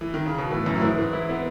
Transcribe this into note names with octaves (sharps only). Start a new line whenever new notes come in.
E3
D#3
C#3
B2
A2 E3
F#2 E4
A2
G#2 E3
E3
E4
B3